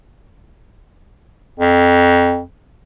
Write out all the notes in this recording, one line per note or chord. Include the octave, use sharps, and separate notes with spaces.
F2